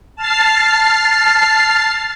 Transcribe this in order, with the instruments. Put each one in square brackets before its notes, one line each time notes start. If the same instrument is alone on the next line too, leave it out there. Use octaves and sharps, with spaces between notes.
[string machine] A5 F6 A6 C7